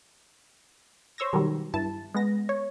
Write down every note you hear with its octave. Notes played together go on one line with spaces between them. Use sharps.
C5 C#5 E6 G#6 A#6
B2 D#3 F#3 G3
G2 E4 A5
G#3 B3 A#6
C#5